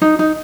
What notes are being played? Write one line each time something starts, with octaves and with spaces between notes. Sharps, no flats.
D#4
D#4